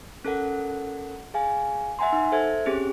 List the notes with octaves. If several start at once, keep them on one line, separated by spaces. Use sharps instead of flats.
C#4 A4 A#4 F#5
G#4 F5 G#5
E5 F#5 G#5 A#5 C6
D#4
A4 C5 E5 G#6
C4 C#4 G4 G#4